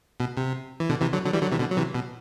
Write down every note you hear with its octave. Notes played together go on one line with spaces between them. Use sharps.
B2
C3
E3
B2 D3
C3 E3
D3 F#3
D3 F#3
E3 G3
D3 F#3
C3 E3
B2 D3
F#3
C3 E3
B2